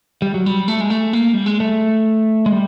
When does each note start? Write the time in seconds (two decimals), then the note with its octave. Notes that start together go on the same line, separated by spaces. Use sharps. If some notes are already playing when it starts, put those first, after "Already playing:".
0.22 G3
0.34 F#3
0.46 G3
0.68 A3
0.81 G#3
0.90 A3
1.13 A#3
1.34 G3
1.46 G#3
1.60 A3
2.46 G#3
2.52 G3